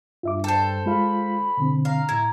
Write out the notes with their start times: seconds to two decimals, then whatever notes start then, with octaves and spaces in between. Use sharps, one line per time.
0.23 G2 F4 E5 D6
0.44 A4 C5 G5
0.86 G#3 F4 F5 B5
1.57 B2 D3 C4
1.85 F5 A#5
2.09 A2 E4 G#6